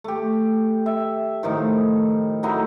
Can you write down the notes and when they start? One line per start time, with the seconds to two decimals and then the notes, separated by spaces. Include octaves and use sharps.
0.04 A3 G4
0.86 E5
1.43 A2 D#3 F3 D#4
2.43 F#3 A3 D#4 E4